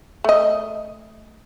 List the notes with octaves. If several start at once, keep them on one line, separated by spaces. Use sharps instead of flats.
A3 D#5